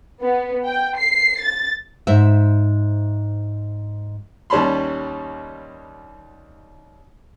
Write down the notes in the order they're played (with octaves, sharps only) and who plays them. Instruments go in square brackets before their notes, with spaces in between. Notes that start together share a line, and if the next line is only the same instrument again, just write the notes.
[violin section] B3
G5
C7
A6
[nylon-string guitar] G#2 C5 E5
[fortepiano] D#2 G3 C#4 A5 B5 C6